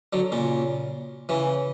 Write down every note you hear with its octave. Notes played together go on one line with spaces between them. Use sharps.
D3 F#3
A#2 C#3
C#3 E3